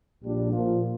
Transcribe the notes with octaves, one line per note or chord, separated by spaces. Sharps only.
A#1 A#2 G3 D4
A#2 F3 A#3 F4